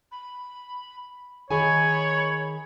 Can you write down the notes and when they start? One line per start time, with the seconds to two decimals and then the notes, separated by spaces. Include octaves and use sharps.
0.11 B5
1.51 D#3 G#4 C#5 G#5 B5